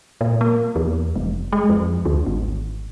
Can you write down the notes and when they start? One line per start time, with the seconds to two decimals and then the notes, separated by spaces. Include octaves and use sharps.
0.21 A#2
0.41 A#3
0.76 E2
1.16 F1
1.53 G#3
1.70 F2
2.05 D2
2.27 G#1